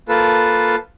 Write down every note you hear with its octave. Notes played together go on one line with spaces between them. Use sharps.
A#3 F4 A4 B4 A5